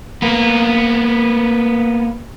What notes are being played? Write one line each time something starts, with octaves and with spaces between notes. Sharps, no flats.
A#3 B3